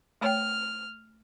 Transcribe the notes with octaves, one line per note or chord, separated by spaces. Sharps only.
A3 C#5 G5 F6